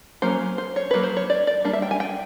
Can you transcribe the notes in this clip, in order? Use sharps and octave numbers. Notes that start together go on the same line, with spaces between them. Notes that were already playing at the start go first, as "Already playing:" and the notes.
F#3 A#3 C#4 C5
C5
C#5
D#3 F#3 A#3 B4
C5
C#5
D5
D5
G3 A#3 D4
E5
G5
G#5
G5